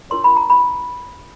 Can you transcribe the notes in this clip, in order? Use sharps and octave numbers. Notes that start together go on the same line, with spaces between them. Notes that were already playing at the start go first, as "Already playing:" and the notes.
D4 F4 A#4 C#5 C6
B5
A#5
B5